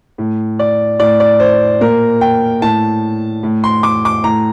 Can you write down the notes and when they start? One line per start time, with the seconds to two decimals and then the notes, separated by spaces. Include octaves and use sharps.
0.18 A2
0.59 D5
0.99 A2 D5
1.20 D5
1.40 C5
1.81 A#2 A#4
2.21 G5
2.62 A2 A5
3.43 A2
3.64 C6
3.83 D6
4.05 D6
4.24 A2 A#5